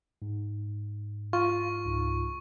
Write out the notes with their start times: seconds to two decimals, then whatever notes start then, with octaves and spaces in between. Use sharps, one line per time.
0.22 G#2
1.33 F4 C#6
1.85 C#2 G#2